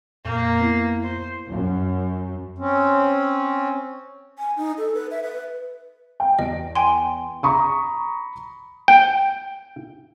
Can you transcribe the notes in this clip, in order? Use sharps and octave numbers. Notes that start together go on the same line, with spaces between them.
F2 A#2 A#3 G6
B3 E4
C5
F#2
C4 C#4
G#5
D#4
A4
B4
E5
B4
G5
E2 D#5 D7
G5 G#5 C6
A#5 B5 C#6 D#6
G5